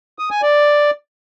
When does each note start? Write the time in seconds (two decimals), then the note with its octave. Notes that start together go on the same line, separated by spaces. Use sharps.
0.19 D#6
0.30 G#5
0.42 D5